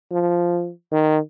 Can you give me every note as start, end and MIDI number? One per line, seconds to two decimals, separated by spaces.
0.12 0.71 53
0.92 1.18 51